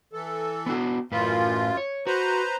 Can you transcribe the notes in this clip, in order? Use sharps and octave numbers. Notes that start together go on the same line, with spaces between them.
E3 A4
B3 D4 F#4
F#2 A2 F4 B4
C#5
F#4 B4 C5 A#5